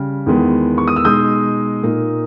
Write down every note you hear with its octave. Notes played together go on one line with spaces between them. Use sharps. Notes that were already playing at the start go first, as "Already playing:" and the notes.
Already playing: C#3 G3
E2 D#3 G#3 B3
C#6
D#6
E6
B2 G#3 D#4 D#6 G6
A#2 A#3 D#4